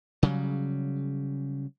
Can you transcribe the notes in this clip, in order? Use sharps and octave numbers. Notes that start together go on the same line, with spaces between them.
C#3 F#3 G3